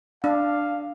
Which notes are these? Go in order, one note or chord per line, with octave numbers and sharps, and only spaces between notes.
D4 F5